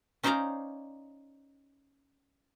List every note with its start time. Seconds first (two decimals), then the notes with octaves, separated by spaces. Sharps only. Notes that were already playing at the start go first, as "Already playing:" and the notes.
0.23 C#4 D#4 C5 D5 F5 A#5